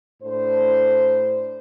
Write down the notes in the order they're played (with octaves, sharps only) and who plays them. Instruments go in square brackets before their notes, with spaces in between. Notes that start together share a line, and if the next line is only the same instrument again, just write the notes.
[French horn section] A2 D4 C5